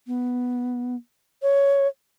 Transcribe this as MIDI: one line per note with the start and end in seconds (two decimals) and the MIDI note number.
0.07 0.95 59
1.42 1.87 73